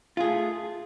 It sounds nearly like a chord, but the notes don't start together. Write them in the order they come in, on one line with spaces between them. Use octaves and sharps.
F4 G#4 A3